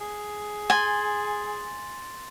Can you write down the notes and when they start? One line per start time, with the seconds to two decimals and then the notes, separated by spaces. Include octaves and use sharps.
0.01 G#4
0.70 G#5 C6 A6 F#7